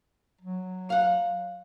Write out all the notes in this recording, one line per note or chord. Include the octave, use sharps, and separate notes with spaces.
F#3
F5 F#5